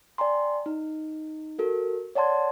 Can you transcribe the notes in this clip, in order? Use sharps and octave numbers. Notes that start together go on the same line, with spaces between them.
D5 G5 G#5 A#5 C6
D#4
F#4 A4 A#4
C#5 D5 F#5 A5 C6 G#6